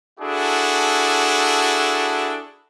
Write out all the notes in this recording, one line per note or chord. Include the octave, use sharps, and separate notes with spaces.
D4 E4 F#4 G#4 A4